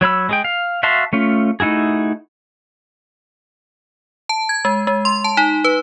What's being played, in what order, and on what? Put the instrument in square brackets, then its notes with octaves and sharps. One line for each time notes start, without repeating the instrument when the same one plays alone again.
[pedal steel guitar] F#3 C#5 B5 E6
G#3 G#4 G5
F5
F#4 E5 F5 A5 C6
A3 C#4 F4
A3 D#4 E4 F#4 G#4
[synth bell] A5
G#6
G#3
G#3
C6
A5
D#4
B4